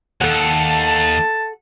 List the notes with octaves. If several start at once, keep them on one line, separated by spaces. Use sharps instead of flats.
D#2 A4 F#5
A5